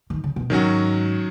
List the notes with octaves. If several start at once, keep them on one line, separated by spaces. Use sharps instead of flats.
D#3
C#3
B2
G#2 D#3 F#3 C#4 F#4